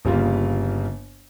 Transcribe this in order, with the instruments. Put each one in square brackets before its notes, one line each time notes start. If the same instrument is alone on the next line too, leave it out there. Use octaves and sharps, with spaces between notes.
[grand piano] G1 C#3 G3 A#3 F4